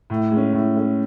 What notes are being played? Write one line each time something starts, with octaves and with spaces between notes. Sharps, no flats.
A2
G#3 C#4
A2
G#3 C#4